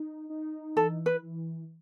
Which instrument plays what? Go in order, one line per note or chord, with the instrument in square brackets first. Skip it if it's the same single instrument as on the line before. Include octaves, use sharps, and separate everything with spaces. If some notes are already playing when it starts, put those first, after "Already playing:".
Already playing: [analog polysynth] D#4
D#4
[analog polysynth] E3 [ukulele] A4
[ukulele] B4
[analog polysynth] E3